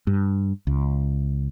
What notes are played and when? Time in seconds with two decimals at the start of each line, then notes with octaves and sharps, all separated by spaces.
0.07 G2
0.67 C#2